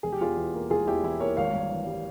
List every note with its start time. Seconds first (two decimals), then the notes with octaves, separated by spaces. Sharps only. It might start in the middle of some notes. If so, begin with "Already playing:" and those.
0.03 E1 G#4
0.12 G4
0.21 E2 F4 G#4
0.37 E3
0.54 A#3
0.70 E1 F4 G#4
0.87 E2 E4 G4
1.03 E3 E4
1.20 A#3 A#4 C#5
1.37 G#1 C#5 F5
1.53 G2
1.70 E3
1.87 G3